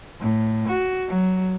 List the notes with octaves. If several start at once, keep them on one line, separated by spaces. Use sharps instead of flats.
A2
F#4
F#3